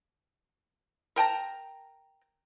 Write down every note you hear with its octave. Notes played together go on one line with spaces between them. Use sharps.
A#4 G5 A5 A#5